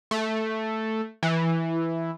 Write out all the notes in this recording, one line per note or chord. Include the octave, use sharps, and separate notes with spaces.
A3
E3